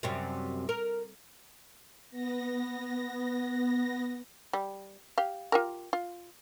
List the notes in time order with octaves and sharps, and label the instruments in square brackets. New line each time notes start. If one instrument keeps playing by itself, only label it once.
[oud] F#2 C3 G3
A#4
[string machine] B3 A#6
[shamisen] G3
G4 F5
F4 G4 A#4
F4